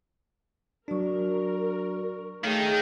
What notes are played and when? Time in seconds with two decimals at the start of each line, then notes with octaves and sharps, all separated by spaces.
0.88 F#3 D4 F#4 A#4 D5 C#6
2.44 D#3 A3 G#4 C#5 F5 G5 A5